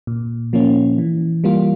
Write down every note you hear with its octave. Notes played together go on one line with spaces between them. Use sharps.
A#2
F3 A#3 C#4
E3
G3 A#3 F4